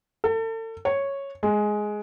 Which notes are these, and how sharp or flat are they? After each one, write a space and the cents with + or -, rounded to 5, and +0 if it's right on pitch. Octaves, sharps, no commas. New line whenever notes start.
A4 +35
C#5 -5
G#3 +10